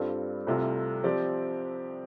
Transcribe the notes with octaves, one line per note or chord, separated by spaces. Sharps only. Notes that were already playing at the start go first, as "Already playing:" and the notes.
Already playing: G2 G3 C4 F4 A4
C2 C3 A3 F4
F3 C4 G4 D5